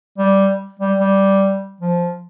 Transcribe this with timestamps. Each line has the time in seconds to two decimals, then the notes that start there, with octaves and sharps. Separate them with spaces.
0.18 G3
0.79 G3
0.99 G3
1.81 F3